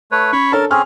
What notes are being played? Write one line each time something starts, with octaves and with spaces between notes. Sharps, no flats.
A3 B4 C#5
C#4 C#5 B5 C#6
D4 A4 A#4 C#5 A5
C4 C#4 G#4 F6